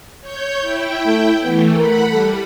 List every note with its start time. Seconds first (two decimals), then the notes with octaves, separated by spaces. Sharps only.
0.21 C#5 G6
0.61 E4 G5
1.06 A3
1.43 E3 A3 B3
1.77 A#4 F#5 B5
2.11 G3 A4